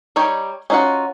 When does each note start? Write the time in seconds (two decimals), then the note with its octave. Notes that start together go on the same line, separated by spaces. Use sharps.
0.16 G3 D#4 G4 C#5
0.70 C#4 D#4 F4 F#4 F#5